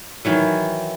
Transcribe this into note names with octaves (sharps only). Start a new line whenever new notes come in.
D#3 E3 F#3